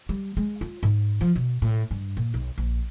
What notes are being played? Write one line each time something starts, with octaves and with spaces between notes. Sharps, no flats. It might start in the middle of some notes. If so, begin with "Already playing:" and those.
G3
G#3
F4
G#2
F3
B2
A2
G2
A#2
B1
A#1